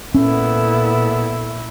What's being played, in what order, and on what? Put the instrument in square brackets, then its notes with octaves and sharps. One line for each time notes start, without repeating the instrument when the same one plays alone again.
[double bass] A#2 E4 [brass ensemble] B3 A4 [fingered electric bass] C#4